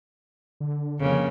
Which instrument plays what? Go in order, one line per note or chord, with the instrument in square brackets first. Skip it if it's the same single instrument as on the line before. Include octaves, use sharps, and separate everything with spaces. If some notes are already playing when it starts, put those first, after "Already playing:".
[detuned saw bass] D3
[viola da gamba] F2 C#3 A#3